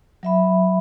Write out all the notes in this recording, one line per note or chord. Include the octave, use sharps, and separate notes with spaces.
F#3 E5 B5